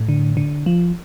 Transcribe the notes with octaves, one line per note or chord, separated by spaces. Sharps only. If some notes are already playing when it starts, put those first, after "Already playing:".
Already playing: A2
D3
D3
F3